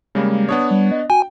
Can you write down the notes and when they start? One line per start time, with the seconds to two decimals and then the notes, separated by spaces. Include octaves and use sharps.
0.15 C#3 G3 G#3 A#3
0.49 B3 D4 C#5 D#6
0.71 G3
0.91 D#5
1.10 F#4 G5 G#5